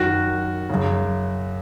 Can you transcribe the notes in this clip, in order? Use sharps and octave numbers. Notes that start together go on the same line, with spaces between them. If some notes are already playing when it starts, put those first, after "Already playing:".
Already playing: F#2 D#3 F#4
F#2 C#3